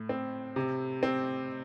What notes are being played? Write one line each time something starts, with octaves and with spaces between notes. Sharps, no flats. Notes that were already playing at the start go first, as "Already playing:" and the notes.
Already playing: A2
C4
C3
C4